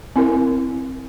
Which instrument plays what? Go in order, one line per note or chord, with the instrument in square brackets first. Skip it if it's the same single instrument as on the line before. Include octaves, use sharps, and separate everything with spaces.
[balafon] C4 E4 A#4